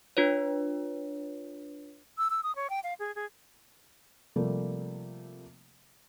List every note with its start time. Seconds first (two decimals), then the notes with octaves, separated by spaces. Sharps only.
0.17 D4 F4 B4 C#5
2.18 E6
2.30 E6
2.43 D#6
2.56 C#5
2.70 G5
2.84 F5
2.99 G#4
3.15 G#4
4.36 C3 F3 G3 A3 A#3